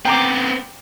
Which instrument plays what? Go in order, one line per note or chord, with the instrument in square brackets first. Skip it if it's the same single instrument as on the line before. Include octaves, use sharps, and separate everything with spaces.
[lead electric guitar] B3 C4 [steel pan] G5 A#5 D6